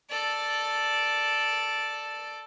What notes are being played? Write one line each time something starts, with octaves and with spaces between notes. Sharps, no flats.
A4 D5